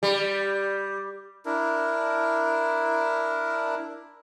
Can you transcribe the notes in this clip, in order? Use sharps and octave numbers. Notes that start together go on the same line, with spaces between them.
G3
D4 E4 A#4